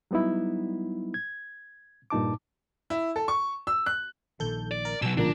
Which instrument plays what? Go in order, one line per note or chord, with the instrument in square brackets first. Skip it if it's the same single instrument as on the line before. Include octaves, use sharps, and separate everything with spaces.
[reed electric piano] F#3 G3 B3 D#4 E4
G#6
G2 A#2 D#4 A5 D6
[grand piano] E4
A4
C#6
E6
F#6
[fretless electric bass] A#1 A#2 D#3 [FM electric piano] A4 G6
[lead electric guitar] D5
[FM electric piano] A#4
[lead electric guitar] B2 F#3 [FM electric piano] E6
[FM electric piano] A1 A#2 A#5 [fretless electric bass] C#3 G3 [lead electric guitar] D4